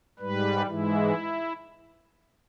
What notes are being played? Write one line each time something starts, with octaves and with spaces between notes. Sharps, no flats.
G#2 G3 B4
G#2 E3 G#3 E4